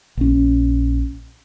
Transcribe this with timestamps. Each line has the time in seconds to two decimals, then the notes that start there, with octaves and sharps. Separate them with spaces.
0.17 A#1 C#4